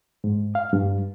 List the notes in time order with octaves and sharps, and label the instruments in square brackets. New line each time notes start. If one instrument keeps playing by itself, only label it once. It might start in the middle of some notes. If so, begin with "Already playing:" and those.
[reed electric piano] G#2
F5
G2